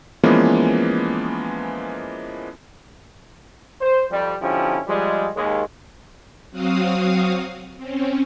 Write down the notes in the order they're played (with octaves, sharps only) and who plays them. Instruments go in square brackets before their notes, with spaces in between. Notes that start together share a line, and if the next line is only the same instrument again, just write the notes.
[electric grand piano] E3 F3 G#3 A#3 B3 C#4
[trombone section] C5
F2 G3
B2 D3 F3 C#4 E4 G4
F3 G3 G#3
D#2 G#3
[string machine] F#3 C4 F#4 F5 D#6
C4 C#4